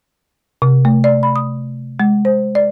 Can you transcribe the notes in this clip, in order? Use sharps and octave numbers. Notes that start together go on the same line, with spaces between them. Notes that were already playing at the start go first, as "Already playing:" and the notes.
C3
A3
D5
B5
D#6
G#3
C5
D5